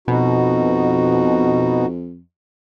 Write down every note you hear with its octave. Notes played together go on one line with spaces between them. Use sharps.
F2 B2 D#4 F#4